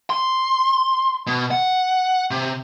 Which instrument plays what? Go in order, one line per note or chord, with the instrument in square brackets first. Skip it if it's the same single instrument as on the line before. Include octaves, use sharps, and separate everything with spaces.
[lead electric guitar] C6
B2
F#5
C3